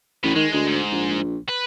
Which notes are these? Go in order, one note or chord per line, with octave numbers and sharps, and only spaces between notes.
A1 A2 B3
D#3 G#3
D2 G#3
G#2
A#1
B4